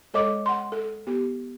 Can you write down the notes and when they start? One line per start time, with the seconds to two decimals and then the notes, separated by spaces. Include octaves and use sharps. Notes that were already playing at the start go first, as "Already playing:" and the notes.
0.14 G#3 A4 C#5 D#5 D6
0.46 F#5 C6
0.72 A4
1.07 B3 G4